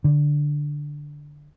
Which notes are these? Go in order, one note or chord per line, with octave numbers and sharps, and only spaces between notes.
D3